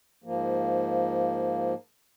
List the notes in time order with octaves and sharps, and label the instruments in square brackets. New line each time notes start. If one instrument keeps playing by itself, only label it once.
[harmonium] G#2 F3 A#3